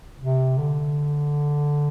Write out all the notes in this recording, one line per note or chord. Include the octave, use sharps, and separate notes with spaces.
C3
D3